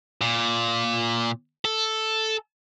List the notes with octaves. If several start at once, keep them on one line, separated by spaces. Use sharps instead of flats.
A#2
A4